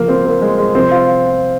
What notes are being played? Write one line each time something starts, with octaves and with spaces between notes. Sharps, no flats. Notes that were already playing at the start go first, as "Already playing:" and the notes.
Already playing: C#3 F3 A#3
C4
A#3
G#3
G#3
C3 F3 C4
F4